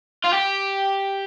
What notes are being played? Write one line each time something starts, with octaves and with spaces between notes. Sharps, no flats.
F4
G4